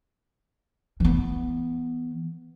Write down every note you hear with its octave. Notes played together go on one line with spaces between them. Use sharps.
E3 B3